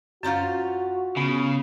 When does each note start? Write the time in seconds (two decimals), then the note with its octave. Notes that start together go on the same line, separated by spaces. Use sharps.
0.23 F#2 C4 C#4 F4 F#4 A#5 G6
1.17 C#3 B3